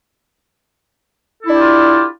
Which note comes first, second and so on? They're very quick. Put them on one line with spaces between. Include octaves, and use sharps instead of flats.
A4 E4 D4 G4 F4